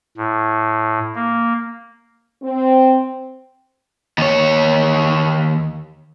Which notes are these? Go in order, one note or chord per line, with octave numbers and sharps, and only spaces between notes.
A2
A#3
C4
D#2 C#5